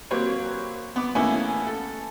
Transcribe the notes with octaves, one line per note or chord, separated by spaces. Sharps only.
F#3 A#3 C4 G4 B4 C#5
B3 D6
A2 A#3 B3 C#4 E4 G#4
A4